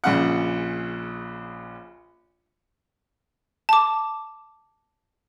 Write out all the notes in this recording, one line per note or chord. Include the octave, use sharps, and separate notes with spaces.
A#1 C#3 F#5
A5 D6